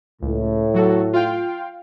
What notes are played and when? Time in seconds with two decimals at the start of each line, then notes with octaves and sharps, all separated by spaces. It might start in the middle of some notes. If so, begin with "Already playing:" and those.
0.22 C#2 A2
0.74 F#3 F#4 A4
1.13 F4 F5 G5